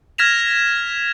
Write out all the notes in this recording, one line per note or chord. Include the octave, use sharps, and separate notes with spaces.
F6 G#6 A#6 B6 E7 F7